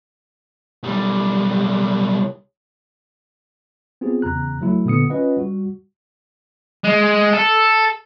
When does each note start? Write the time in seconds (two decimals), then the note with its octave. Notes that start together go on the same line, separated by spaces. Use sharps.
0.83 B1 G3
4.01 B3 C4 F4 G4 G#4
4.22 E2 C#3 A#5 F#6
4.61 F#3 A3 E4 F#4
4.85 A#2 D3 B3 D#6 C#7
5.10 C#4 F4 B4 D#5 F#5
5.37 G3 F#4
6.84 G#3
7.33 A4